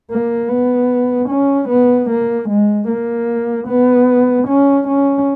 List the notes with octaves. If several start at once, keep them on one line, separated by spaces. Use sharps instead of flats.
A#3
B3
C#4
B3
A#3
G#3
A#3
B3
C#4
C#4